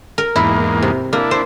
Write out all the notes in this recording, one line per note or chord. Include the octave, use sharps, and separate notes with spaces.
A#4
E2 G#2 A#3 E4
C3
A#3 D4 E4
C5